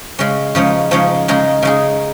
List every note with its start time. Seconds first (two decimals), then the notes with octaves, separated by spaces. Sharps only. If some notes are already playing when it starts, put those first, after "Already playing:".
0.19 C#3 G#3 C#4
0.55 C#3 F3 G#3 D#4 C#5
0.91 C#3 F3 G#3 D#4 C#5
1.28 C#3 G#3 D#4 G#4
1.62 C#3 G#3 D#4 G#4